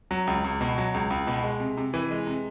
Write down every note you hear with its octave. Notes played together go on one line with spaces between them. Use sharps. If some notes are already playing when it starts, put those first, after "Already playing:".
F#3
C#2
C#2
B2
F#3
C#2
C#2
B2
G#3
C3
C3
E3
G#3
C3